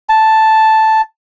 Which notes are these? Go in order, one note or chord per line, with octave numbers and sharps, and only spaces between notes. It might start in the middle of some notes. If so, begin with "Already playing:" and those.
A5